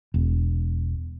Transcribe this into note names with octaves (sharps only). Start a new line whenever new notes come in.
E1